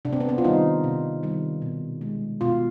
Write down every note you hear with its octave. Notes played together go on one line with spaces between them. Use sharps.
C3 D4
C4
B3
C4
F4
D#3 G3 D#4
C3
D#3 G3
B2
G#3
B2 F4